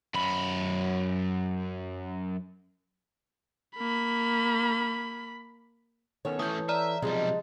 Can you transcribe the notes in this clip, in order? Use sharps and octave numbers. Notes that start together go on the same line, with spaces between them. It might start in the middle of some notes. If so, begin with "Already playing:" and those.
F#2 B5
A#3 B5
D#3 B3 C#4 A4 C#5
E3 A3 C#4 D#6 G6
D5 E5 A#5 F6
B1 C3 F3 G3 G#3 D#4 A5